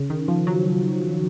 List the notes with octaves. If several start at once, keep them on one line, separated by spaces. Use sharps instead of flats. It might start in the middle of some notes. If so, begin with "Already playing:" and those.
Already playing: C#3
D#3
F3
F#3